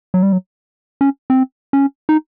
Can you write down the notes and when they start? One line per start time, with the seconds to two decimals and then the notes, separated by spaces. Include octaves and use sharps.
0.14 F#3
0.23 G3
0.33 F#3
1.01 C#4
1.30 C4
1.73 C#4
2.09 D#4